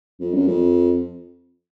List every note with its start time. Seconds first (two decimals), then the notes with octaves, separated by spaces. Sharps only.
0.21 F2
0.34 F#2
0.48 F2